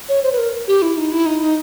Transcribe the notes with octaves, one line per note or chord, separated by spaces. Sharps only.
C#5
C5
B4
A#4
G4
E4
D#4
E4
D#4
D#4